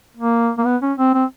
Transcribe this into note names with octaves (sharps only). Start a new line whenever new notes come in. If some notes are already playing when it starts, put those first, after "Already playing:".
A#3
A#3
B3
C#4
C4
C4